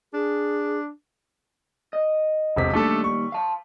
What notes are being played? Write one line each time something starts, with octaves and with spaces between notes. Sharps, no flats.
D4 G#4
D#5
E1 C3 B6
D#2 G3 A3 D4 A4
C#6
F5 A5